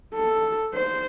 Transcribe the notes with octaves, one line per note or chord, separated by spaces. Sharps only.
A4
C5